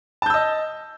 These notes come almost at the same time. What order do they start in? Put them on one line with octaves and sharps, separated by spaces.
A5 G6 E6 D#5